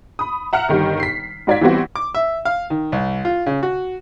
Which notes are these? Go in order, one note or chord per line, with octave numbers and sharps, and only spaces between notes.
B5 D#6
E5 F#5 A#5 F6 C#7
G1 D#3 G3
B6 C7
G#2 F#4 D5 F5 G#6 B6
E3 G3 B3 C4 F#4
D6
E5
F5
D#3
C2
F4
C#3
F#4